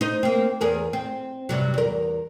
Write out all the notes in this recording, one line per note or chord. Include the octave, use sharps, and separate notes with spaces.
D#4 C5
A#3 C4
E2 G#4 A#4
C4
G2 C3 F#3
E2 A#4